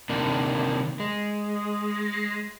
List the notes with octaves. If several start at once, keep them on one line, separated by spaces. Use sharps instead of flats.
C3 D#3 A#3 D4
G#3